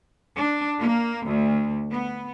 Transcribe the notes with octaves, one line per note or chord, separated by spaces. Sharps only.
D4
A#3
D2
B3